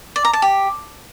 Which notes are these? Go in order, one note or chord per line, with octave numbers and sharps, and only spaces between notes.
D5
A#5
A5
G4